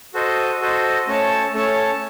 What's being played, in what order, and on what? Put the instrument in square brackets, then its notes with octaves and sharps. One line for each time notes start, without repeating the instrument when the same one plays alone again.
[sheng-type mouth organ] F#4 A4 C5 D#5
F#4 A4 C5 D#5
A3 C#4 A4 C#5 A5
A3 C#4 A4 C#5 A5